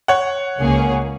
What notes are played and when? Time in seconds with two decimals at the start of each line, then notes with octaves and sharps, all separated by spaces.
0.08 C#5 F#5
0.58 C#2 C#3 A#3 C#4 G#4